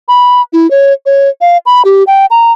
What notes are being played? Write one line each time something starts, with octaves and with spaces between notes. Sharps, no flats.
B5
E4
C#5
C#5
F5
B5
G4
G5
A#5